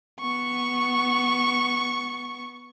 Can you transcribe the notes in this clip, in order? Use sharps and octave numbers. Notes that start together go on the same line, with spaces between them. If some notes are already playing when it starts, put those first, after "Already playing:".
B3 C#6